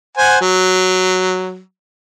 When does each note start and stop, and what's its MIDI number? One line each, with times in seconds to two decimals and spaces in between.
0.18 0.38 72
0.18 0.38 78
0.18 0.38 80
0.41 1.60 54